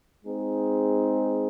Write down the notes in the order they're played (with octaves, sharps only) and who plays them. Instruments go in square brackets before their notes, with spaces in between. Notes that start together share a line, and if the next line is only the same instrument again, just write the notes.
[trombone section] G#3 C4 D#4 G#4